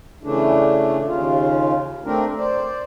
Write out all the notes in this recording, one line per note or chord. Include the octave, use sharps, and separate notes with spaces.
C#3 E3 A3 D4
D#2 C#3 F4
A3 C4 D4 A#4
C5 D5